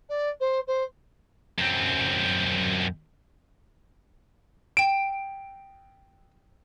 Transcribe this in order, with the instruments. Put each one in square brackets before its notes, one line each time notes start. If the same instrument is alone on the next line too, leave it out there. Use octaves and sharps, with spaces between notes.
[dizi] D5
C5
C5
[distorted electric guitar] F#2 C4
[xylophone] G5 E7 [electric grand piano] D7